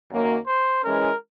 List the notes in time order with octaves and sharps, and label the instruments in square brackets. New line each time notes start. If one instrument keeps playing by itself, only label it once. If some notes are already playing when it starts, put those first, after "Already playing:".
[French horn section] F#2 D#3 F#3 A#3
[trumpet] C5
[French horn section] E3 G#3 C#4 [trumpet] A#4